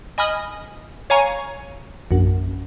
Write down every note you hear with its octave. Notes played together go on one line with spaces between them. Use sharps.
D#5 G#5 B5 D#6 F6
C#5 F5 G#5 A#5 C#6
A#1 F#2